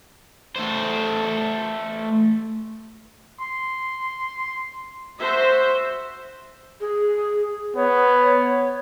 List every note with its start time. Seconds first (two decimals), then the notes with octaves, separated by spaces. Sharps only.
0.56 A3 C5
3.40 C6
5.20 F#4 C5 E5
6.81 G#4
7.76 B3 C#5